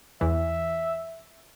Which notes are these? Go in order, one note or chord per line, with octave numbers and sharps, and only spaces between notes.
E2 E3 E5